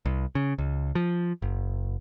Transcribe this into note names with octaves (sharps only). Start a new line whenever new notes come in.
C2
C#3
C#2
F3
F#1